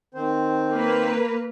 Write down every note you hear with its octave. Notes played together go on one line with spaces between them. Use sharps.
D#3 C4 C5
A#3 B4